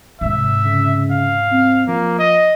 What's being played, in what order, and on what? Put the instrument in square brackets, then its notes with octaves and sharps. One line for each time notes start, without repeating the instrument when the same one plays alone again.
[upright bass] G#2 C3 [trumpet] E5
[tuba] C#3
[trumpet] F5
[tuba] C4
[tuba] F3 [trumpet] A#3
[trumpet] D#5